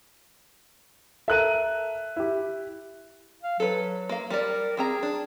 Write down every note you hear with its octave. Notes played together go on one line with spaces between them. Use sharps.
A4 A#4 E5 F#6 D#7
E4 G4
F5
F#3 A4 B4
A#3 F5
G3 A#4 D5
G3 C4 G#4 A#5
D4